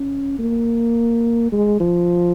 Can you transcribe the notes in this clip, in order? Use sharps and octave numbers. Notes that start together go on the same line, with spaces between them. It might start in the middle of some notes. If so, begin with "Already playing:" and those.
Already playing: C#4
A#3
G#3
F3